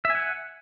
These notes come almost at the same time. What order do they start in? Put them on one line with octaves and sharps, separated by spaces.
E5 G#5 F#5